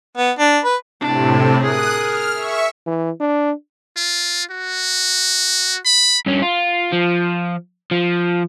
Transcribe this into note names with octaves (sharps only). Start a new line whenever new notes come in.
B3
D4
B4
A2 C3 D4
G#4 A#4 D#6 F#6
F6
E5 C#6
E3
D4
F4
F#4
B5
G2 C#4
F4
F3
F3